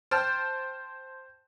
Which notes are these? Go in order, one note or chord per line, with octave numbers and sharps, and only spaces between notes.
C5 G5 A5 F6